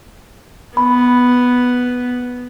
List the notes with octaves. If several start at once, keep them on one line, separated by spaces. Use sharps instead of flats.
B3 B5